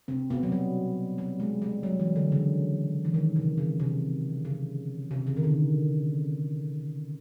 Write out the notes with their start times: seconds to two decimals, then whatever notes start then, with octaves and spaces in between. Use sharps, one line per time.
0.08 C3 C4
0.30 B2 B3
0.43 F#3
0.52 G3
1.18 G3
1.40 G#3
1.62 G3
1.83 F#3
2.00 E3
2.16 D3
2.32 C#3
3.05 E3
3.14 D#3
3.36 C3
3.58 C#3
3.80 C3
4.45 C#3
5.11 C3
5.27 C#3
5.37 D#3
5.43 D3